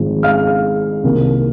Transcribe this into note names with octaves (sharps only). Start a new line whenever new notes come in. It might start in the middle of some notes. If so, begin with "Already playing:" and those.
Already playing: G#1 G#2 F3
F5 F6
C2 C3 D#3 A#3